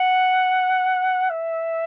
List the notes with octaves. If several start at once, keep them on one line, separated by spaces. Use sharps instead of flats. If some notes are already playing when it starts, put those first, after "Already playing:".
Already playing: F#5
E5